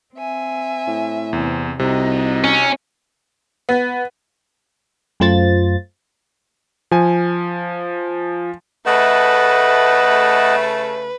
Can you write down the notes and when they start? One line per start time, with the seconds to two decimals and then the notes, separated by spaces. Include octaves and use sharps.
0.14 C4 E5 G#5
0.87 A2
1.33 E2 C3 C4
1.79 C2 C3 D#4 F#4 D#5
2.44 C#4
3.69 B3
5.20 F#2 A3 F4 C5 A6
6.91 F3 G#5
8.87 C#3 A3 B4 D#5 F#5